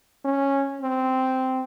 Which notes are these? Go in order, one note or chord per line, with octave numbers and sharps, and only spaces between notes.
C#4
C4